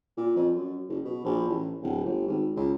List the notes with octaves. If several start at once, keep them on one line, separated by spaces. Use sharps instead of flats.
A#2
F2
F#2
F#1
B2
A#1
A1
D1
G1
G#1
C#2